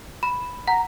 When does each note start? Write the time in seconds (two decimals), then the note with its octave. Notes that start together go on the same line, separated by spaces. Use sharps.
0.23 B5
0.67 F#5 A#5